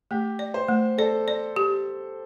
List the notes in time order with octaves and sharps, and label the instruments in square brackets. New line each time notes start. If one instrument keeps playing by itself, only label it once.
[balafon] A3 [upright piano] G4
[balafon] D5
[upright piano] C5
[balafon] A3
[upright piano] A4 [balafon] D5
[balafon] D5
G4